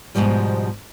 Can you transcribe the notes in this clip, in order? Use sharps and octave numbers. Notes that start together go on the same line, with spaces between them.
G#2 B2 F3 G3